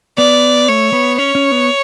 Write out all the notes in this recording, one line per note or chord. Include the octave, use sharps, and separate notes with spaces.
B3 D5
A3 C#5
B3
C#4 C#5
C#4
B3